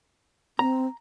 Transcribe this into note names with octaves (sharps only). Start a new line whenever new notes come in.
C4 A#5